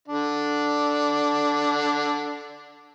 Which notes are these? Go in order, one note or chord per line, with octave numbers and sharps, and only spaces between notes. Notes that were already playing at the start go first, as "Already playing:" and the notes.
D3 D4